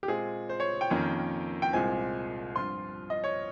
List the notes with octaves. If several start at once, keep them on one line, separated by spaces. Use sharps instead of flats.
G4
A#2 G#3 C4 G#4
C5
C#5
G5
F2 D#3 A#3 C#4
G5
C2 A#2 G#3 C4 G#5
G2 F3 C4 F4 C6
D#5
C#5